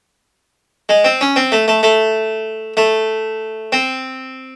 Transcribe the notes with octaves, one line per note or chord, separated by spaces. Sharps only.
G#3
C4
C#4
C4
A3
A3
A3
A3
C4